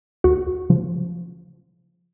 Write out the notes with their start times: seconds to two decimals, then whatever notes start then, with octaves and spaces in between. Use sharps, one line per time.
0.24 D#2 F#4
0.70 C#3 F3